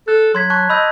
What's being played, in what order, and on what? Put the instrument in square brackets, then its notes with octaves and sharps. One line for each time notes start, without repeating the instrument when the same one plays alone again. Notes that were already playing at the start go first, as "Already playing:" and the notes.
[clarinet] A4 [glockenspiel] F#6
[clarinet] F#3 [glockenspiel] C6 G#6 B6
[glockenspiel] A5 C#6 F#6
[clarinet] D#5 [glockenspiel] B5 E6 G6